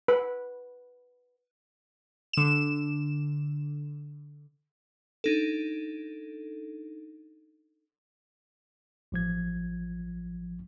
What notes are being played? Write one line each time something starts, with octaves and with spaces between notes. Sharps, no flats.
B4
D3 E7
D4 D#4 A4
A1 F3 G#6